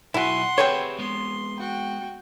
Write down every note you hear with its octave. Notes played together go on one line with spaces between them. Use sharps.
B1 E4 F#4 F#5 G#5 C6
C4 G4 G#4 B4 C#5 E5
G#3 B3 C6
F#4 G5